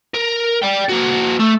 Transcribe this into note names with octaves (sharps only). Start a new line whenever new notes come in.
A#4
D5 G5
A#3 F#4
A3